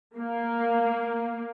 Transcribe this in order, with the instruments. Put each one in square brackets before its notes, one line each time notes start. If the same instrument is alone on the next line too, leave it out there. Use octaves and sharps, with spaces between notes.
[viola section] A#3